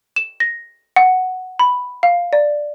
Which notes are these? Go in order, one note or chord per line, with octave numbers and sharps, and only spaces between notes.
E7
A#6
F#5
B5
F5
D5